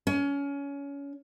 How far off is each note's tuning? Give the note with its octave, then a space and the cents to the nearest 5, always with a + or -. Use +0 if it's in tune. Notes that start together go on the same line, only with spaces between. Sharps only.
C#4 +25